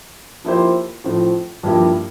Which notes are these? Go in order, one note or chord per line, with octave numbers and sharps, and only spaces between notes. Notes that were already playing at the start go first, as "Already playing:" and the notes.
F3 A#3 E4 G4 C5
A2 F3 C4
G2 F3 A#3 E4 G4